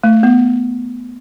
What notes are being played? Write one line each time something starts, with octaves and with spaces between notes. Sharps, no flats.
A3
B3